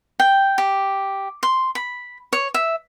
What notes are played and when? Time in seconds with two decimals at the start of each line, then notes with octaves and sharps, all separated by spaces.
0.20 G5
0.58 G4
1.43 C6
1.75 B5
2.33 C#5
2.54 E5